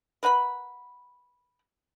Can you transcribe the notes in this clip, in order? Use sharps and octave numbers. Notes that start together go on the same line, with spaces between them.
A#4 B4 F#5 B5